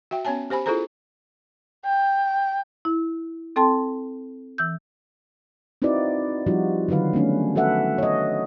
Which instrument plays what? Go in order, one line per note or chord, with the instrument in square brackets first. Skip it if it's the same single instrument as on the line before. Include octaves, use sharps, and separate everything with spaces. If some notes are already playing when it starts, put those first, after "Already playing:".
[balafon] F#4 E5 G5
B3 C#4 C#5 G#5 A5
G4 C5 G#5 B5
E4 F4 G#4 A4 C5 A#5
[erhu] G5
[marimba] E4
C4 A4 G5 A5 C6
E3 E6 G6
[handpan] C4 D#4 E4 F#4 B4 D5
F3 G3 D#4 F4 F#4
D3 D#3 F#3 B4 F5
A3 B3 C#4 D4
F#4 A4 B4 E5 F#5
C#5 D#5